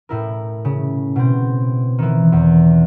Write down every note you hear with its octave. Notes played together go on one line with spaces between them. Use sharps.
A2 E4 A#4
C#3
B2 C4
D#3 E3
E2